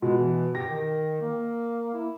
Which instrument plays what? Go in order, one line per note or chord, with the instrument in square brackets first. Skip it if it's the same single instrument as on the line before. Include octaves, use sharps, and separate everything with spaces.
[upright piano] B2 [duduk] G#3
[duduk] E3
[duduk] G4 [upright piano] A#6
[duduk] D#3
A#3
E4